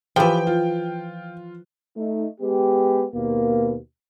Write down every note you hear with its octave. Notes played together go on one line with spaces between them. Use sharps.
E3 F3 F4 G4 B4 G5
F4
A3 D#4
G#3 B3 G4
D#2 B2 A#3